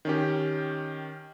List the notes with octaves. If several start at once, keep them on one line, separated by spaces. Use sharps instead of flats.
D#3 C#4 G4